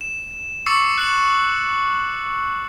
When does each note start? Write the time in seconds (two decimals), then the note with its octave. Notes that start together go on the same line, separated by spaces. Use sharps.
0.01 E7
0.66 C#6 D6 E6 A6 C7 C#7
0.98 F#6 C#7 F#7